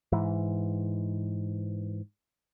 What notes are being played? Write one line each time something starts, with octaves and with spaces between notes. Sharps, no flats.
G#2 E3